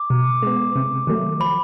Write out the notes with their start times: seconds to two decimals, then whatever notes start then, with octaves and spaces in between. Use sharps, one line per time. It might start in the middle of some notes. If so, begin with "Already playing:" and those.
Already playing: D6
0.10 B2
0.42 G#3 B3
0.76 C3
1.07 D#3 F#3 A3
1.40 F3 B5